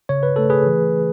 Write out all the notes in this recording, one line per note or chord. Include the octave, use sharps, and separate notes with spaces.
C#3 C#5
B4
A3 A4
G#4 B4
E3